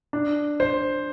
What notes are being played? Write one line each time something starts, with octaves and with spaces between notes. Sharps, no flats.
D4
C5